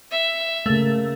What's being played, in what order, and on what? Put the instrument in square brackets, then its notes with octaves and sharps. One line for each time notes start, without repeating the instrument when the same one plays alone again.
[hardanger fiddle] E5
[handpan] C#3 A#3 [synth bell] A3